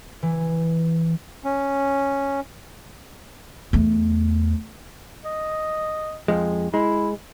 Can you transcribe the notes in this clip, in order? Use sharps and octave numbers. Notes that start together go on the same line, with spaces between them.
E3
C#4
E2 A3
D#5
F2 F3 G#3
G#3 E4